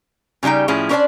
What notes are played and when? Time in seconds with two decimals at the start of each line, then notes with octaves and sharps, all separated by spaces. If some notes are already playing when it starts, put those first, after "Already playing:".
0.43 C#3 F3 G3 D#4 G5
0.68 A2 F3 C#4 E4 G#4
0.89 C#4 D4 A#4 C5 D5 A5